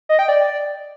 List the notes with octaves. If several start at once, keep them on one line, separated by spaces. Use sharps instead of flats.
D#5
G5
D5